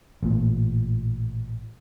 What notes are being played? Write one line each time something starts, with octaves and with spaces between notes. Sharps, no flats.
A1 A#2